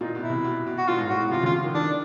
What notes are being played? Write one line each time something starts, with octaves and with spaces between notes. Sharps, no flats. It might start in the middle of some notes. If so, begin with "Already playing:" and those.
A#2 D#4
B2
E4
C3
B2
B2
F#4
A#2 F4
G#2
A2 F#4
B2
C3 F4
C#3
F4
D#3
D#3 D4